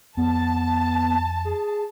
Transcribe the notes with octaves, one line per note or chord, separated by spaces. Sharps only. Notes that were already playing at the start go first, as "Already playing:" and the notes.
F2 B3 A5
G#4